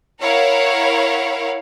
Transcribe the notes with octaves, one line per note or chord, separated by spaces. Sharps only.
E4 A#4 C#5 F5 F#5